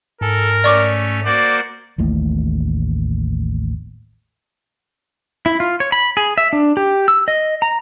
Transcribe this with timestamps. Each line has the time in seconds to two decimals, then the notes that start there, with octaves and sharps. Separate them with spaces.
0.21 G#2 A4 A#4 G#5
0.64 A3 C#4 D5 C#6 D6
1.26 A#3 F#4 C5 D5
1.98 A1 D#2 A2
5.46 E4
5.60 F4
5.80 C#5
5.92 B5
6.17 G#4
6.38 E5
6.53 D4
6.77 G4
7.08 E6
7.28 D#5
7.62 A#5